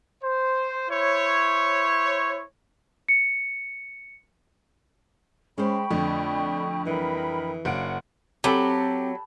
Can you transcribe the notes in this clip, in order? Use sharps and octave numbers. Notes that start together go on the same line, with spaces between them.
C5
E4 C5 C#5
C#7
G#3 C#4 C5 G5 B5 C#6
F2 D3 A3 D4
E3 G3 A#4 G5 B5
F#1 D4 C#5 F5 F#5 D7
F#3 C4 G4 A4 G5 A5 B5